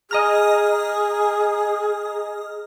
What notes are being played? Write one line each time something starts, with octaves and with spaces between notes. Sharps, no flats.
G#4 D#5 A#5 F6